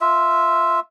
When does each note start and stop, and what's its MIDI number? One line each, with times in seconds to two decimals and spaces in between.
0.01 0.80 65
0.01 0.80 76